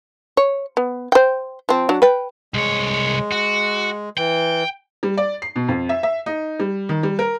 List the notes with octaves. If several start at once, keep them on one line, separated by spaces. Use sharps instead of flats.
C#5
B3
C5 G5
F3 C4
F#3 D4
B4 G5
C2 G#3 C#5
F#4
E3 G5
G3
D5
C7
B2
F2
E5
E5
D#4
G3
D#3
G3
A#4